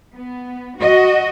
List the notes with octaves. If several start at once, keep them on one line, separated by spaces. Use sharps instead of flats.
B3
F#4 D#5